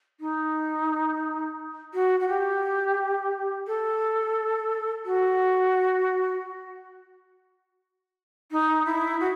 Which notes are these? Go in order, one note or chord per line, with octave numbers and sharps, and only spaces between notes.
D#4
F#4
F#4
G4
A4
F#4
D#4
E4
F#4